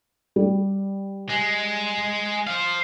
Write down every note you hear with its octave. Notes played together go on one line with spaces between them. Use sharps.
G3
G#3
C5 F5